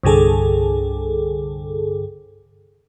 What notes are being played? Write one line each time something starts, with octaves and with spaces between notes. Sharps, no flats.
C2 G2 D3 G#4 A4